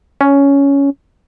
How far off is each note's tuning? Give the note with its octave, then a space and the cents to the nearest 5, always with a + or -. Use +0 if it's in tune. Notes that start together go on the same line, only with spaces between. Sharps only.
C#4 +10